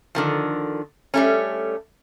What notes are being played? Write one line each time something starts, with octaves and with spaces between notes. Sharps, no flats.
D3 D#3 F3
G3 A3 C#4